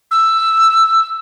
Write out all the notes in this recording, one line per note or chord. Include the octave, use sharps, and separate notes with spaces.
E6